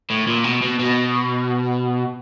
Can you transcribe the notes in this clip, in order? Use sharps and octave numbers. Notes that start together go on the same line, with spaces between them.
A2
A#2
B2
B2
B2